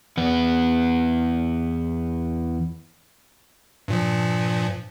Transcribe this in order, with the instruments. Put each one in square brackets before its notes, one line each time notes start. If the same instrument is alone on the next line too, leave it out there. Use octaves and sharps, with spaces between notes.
[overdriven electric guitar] E2 B3
[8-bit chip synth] G2 A#2 F3